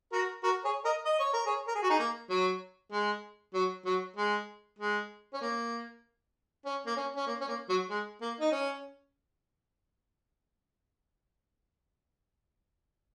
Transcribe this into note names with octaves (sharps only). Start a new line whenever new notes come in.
F#4 A#4
F#4 A#4
G#4 C#5
A#4 D#5
D#5
C#5
A#4
G#4 C#5
A#4
G#4
F#4
D#4 G#4
A#3
F#3
G#3
F#3
F#3
G#3
G#3
C#4
A#3
C#4
A#3
C#4
C#4
A#3
C#4
A#3
F#3
G#3
A#3
D#4
C#4